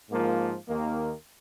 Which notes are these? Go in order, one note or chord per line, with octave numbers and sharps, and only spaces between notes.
G#2 F3 A#3 F4
D#2 D#3 A#3